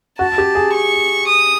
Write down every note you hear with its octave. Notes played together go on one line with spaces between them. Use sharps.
F#4 A5
G4
G#4
C#6
D#6